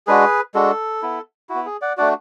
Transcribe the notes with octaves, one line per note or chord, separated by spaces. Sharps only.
G#3 D4 F#4 G#4 B4
G#3 D4 F#4 A4
B3 E4
E4 F#4
B3
G#4
D5 F#5
A3 D4 F#4 D5 F#5